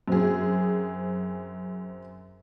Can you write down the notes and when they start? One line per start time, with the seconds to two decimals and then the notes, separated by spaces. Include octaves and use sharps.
0.08 F#2 C4 G#4